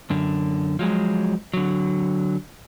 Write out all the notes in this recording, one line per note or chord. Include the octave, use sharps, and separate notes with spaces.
F#2 D3
F3 F#3 G#3
D3 F#3